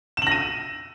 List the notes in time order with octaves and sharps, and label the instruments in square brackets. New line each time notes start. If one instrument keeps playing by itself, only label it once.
[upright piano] E7
F#7
A#6
D#7